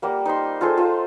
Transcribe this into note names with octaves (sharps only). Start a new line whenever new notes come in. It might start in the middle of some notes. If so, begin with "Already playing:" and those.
G3 A#3 F#5
D#4 C5 C6
F4 G#4 A4 C5
F4 A4 C5